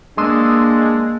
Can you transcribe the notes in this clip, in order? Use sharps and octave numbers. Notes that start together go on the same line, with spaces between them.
G#3 A#3 D4 C6 D#6 E6